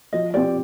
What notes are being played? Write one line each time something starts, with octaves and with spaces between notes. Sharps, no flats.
F3 D#5
C4 G4 D5